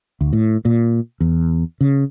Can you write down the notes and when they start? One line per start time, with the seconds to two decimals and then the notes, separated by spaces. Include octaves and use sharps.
0.21 D2
0.33 A2
0.65 A#2
1.20 E2
1.81 C#3